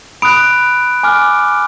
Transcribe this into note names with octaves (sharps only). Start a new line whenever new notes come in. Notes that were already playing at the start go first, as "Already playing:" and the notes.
B5 D#6 F#6 D7
G#5 D6 F6